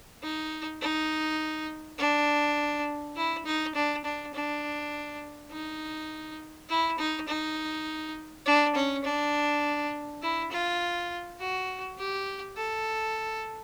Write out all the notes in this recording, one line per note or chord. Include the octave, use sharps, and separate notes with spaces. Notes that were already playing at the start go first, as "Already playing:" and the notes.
D#4
D#4
D4
E4
D#4
D4
D4
D4
D#4
E4
D#4
D#4
D4
C#4
D4
E4
F4
F#4
G4
A4